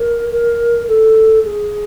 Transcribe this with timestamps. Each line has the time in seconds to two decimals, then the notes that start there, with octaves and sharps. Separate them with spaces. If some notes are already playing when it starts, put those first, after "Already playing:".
Already playing: A#4
0.31 A#4
0.88 A4
1.45 G#4